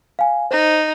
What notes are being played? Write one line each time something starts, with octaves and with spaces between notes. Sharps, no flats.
F5 G#5
D#4 C5